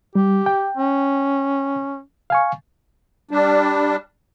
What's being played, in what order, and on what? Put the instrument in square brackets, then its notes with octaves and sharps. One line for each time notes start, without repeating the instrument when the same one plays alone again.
[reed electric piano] G3 [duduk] G4
[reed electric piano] G5
[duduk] C#4
[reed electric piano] F5 G#5 C#6
[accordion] G3 D4